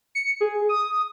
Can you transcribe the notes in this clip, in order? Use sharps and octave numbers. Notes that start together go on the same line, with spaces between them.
C#7
G#4
D#6